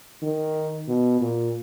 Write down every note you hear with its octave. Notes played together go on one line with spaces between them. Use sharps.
D#3
B2
A#2